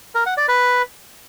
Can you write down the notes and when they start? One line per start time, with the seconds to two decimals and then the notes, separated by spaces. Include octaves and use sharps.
0.15 A#4
0.26 F#5
0.37 D5
0.48 B4